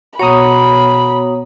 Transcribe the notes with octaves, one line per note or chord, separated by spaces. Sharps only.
B2 B3 F#4 C#5 A#5 B5 D#6